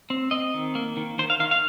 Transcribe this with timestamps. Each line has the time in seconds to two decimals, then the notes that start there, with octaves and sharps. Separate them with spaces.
0.10 C4
0.31 C4 D#5
0.54 D#3
0.75 A#3
0.97 D#3
1.19 D#3 C5
1.30 F5
1.40 D#3 F5
1.51 F5